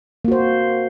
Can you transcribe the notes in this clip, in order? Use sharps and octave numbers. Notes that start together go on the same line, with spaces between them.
A#3 F#4 C5